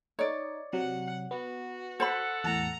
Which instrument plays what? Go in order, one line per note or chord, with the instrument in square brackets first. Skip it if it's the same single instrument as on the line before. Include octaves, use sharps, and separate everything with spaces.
[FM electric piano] D#4 [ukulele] C#5 D5
[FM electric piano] C3 F#3 [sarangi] F#5
[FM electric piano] B3 [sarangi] F#4
[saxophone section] A4 F#5 [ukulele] C5 B5
[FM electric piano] E2 A2 [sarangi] A#5